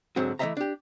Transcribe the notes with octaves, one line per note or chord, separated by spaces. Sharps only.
G#2 D3 F#3 C4 F#4
E3 A3 C#4 D#5 E5 A#5
D4 G4